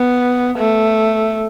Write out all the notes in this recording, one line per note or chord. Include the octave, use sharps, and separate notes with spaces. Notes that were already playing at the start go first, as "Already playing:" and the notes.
Already playing: B3
A3